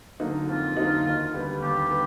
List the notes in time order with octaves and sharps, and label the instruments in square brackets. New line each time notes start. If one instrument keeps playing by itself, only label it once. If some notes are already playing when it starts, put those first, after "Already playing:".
[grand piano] D3 F#3 A#3 D#4
[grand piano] F2 [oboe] F4
[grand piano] D3 F#3 A#3 D#4
D#2
D3 G3 B3
[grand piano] D#2 [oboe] G4
[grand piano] D3 G3 B3